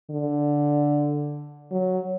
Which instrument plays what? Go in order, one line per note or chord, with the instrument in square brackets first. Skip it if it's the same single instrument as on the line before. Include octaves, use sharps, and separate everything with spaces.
[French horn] D3
F#3